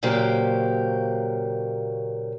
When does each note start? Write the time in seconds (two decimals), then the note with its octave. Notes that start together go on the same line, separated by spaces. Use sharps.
0.03 A#2 C#3 F#3 A#3 G4 C5